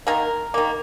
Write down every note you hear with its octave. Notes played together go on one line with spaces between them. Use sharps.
D#3 A#3 A#4
D#3 A#3